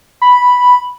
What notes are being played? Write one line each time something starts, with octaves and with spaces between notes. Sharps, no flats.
B5